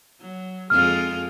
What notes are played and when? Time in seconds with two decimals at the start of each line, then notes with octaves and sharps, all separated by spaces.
0.20 F#3
0.70 F2 G#3 F4 F6